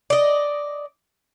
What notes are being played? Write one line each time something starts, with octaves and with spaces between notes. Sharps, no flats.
D5 D#5